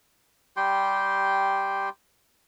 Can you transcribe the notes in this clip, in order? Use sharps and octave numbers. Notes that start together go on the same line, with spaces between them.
G3 G4 G5 C6